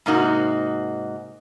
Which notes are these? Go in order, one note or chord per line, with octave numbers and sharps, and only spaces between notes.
G#2 C3 A#3 D#4 F#4